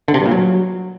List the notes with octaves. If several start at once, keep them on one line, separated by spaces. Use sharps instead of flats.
D3
C3
G2
A#2
F#3